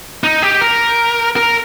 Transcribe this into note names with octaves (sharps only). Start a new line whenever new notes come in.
D#4
G4
A#4
A#4